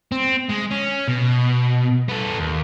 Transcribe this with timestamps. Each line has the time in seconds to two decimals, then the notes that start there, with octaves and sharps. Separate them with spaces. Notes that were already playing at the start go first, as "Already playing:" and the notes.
0.12 C4
0.50 G#3
0.71 C#4
1.08 B2
2.09 B3 A4
2.39 D#2